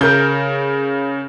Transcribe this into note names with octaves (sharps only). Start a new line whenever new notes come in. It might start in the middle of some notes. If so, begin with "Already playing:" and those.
C#3 A#4 G6